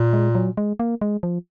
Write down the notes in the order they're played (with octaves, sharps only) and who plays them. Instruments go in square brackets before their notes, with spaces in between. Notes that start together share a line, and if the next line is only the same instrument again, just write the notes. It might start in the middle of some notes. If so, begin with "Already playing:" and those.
Already playing: [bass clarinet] A#2
[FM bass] G#3
F#3
G#3
A#3
G#3
F3